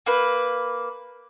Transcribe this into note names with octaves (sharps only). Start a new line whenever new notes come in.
A#3 B4